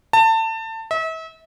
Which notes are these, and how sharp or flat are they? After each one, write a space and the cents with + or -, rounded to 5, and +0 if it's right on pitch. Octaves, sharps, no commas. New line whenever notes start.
A5 +25
E5 -40